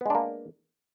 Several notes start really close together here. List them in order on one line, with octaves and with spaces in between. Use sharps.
B3 G#3 D4 A#3